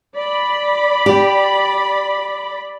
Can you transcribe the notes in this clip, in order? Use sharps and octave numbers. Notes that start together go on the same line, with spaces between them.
D5 B5
G4